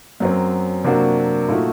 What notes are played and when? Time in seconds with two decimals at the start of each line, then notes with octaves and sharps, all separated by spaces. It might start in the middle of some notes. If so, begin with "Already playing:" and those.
0.20 F#2 F#3 C4
0.84 C3 F#3 A#3 D4 F#4
1.48 A#2 A3 D#4 F#4